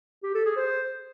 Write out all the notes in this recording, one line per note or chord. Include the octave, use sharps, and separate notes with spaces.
G4
A4
G#4
C5